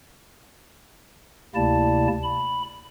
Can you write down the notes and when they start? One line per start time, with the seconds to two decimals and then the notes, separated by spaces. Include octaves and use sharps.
1.55 D2 C3 A#3 E4 D5 A5
2.23 B5